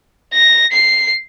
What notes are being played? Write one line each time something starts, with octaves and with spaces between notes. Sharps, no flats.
A#6
C7